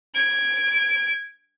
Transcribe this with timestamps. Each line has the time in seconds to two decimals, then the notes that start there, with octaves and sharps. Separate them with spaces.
0.14 G#6 D7